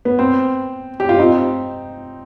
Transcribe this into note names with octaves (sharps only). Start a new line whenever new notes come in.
B3
C4
G4
F4
C4 D#4